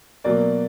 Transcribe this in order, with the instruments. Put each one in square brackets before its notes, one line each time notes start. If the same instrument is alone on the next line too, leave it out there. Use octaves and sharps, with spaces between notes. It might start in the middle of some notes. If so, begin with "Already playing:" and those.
[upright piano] B2 F#3 A#3 D5